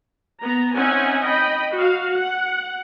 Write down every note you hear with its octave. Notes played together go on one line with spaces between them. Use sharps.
B3 A#5
C4 C#4 D#4 E5 F#5 G#5
D#5 G5 B5
F#4 F5
F#5